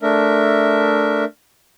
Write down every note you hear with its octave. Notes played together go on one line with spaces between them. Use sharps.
A3 D4 A#4 E5